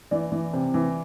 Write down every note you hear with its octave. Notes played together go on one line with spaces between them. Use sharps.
E3 D5
E3
C3
E3